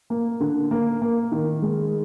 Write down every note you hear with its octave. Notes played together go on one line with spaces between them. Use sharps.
A#3
D3
A#3
A#3
D#3
G#3